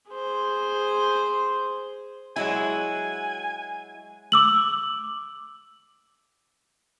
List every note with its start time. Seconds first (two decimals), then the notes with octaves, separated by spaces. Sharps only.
0.12 G#4 C5
2.36 F#3 G#3 E4 G#5
4.32 D6 E6 F#7